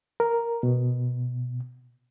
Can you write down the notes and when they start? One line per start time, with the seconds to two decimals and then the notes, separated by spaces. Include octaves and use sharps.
0.20 A#4
0.63 B2